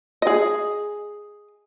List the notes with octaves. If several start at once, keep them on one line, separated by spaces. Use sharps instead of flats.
G#4 D#5